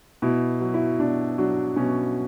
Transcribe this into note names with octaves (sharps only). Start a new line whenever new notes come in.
B2 E4
F#3
E4
B2 D4
F#3 D4
B2 C#4